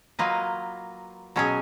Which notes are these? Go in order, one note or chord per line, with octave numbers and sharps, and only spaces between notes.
F#3 A#3 F4 B4 D#5
B2 F#3 C#4 G#4